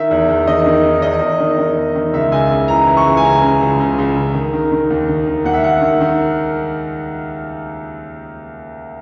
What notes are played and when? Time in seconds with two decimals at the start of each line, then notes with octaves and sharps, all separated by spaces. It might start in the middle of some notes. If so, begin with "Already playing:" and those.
Already playing: D#3 E5
0.11 E2
0.29 E2
0.47 D#3 D#5
0.66 D#3
0.84 D#3
1.02 E2 D#5
1.21 E2
1.40 D#3
1.58 D#3
1.77 E2
1.96 D#3
2.13 C#2 E5
2.32 C#2 G#5
2.51 C#3
2.68 E3 A#5
2.87 E3
2.97 C#6
3.06 C#2
3.17 G#5
3.23 C#3 A#5
3.42 C#3
3.61 C#2
3.79 C#2
3.98 C#2
4.16 C#3
4.34 D#3
4.53 D#3
4.72 D#3
4.90 D#2
5.08 D#3
5.27 D#3
5.44 D#2 F#5
5.53 E5
5.63 D#2 F#5
5.81 D#3
6.00 D#3